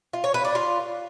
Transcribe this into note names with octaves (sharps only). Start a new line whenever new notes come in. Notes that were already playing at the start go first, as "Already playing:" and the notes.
F4
C#5
B4
D4
F4